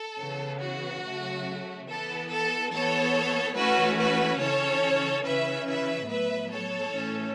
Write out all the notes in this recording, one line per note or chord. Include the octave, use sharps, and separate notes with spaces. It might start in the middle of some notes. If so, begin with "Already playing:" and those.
Already playing: A4
C#3 E3 B3
F#4
C#3 F#3 A3
E3 B3 A4
A4
E3 B3 A4 C#5
E3 A3 C#4 F#4 B4
F#4 B4
C#3 E3 C#4 A4 C#5
C#3 E3 C#4 B4 E5
B4 E5
A2 F#3 B3 B4 E5
A4 C#5
A2 E3 A3 C#4